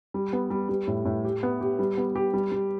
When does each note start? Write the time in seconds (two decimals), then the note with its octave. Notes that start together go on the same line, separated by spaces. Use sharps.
0.14 G3
0.33 B3
0.50 G3
0.69 G3
0.87 A2
1.05 A2
1.25 G4
1.43 B3
1.61 G4
1.79 G3
1.98 B3
2.16 G4
2.34 G3
2.52 G3